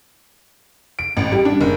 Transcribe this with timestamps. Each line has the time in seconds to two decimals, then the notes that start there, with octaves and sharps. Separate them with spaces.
0.99 D7
1.17 A1
1.32 G3
1.45 D4
1.61 F#1